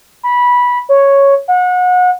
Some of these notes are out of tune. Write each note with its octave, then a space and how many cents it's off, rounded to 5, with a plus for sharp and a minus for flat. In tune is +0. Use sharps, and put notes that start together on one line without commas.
B5 -15
C#5 +0
F#5 -30